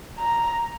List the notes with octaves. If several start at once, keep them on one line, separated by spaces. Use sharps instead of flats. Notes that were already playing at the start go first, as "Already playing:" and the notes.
A#5